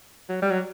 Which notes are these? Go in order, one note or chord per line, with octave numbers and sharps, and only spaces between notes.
F#3
G3
F#3